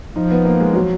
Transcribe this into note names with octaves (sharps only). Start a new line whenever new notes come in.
F3 D#4
B3
A#3
G#3
F#3